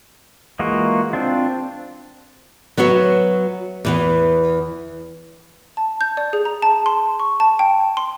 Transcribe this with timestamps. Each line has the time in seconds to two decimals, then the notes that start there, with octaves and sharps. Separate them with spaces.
0.59 E3 G#3 A#3 F4 F#4
1.13 C4 D4 F4
2.77 F#3 B3 F#4 C#5 E5
3.85 E2 E3 B3
5.77 A5
6.01 G6
6.17 D5
6.33 G#4
6.45 A#5
6.62 A5
6.86 C6
7.20 C#6
7.40 A5
7.59 G5
7.97 C6